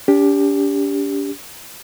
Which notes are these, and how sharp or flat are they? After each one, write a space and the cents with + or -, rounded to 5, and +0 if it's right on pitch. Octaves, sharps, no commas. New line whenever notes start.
D4 -45 G4 +10